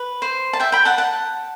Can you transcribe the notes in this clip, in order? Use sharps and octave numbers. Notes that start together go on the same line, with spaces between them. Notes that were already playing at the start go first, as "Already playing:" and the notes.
Already playing: B4
C5
A5
E5 G5
G5 B5
F#5 A5
F#5 A5